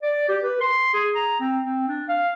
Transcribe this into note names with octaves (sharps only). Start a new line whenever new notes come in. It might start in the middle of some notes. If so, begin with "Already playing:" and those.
D5
G4
B4
C6
G#4
A#5
C4
C4
D4
F5